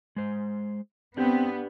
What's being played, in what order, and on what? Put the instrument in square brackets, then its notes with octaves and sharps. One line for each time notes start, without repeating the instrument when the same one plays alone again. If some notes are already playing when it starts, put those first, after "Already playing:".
[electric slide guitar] G#3 C5
[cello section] B3 [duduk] C4 [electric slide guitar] D4 G4